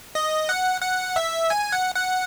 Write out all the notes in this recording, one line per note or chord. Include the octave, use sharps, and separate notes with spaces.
D#5
F#5
F#5
E5
G#5
F#5
F#5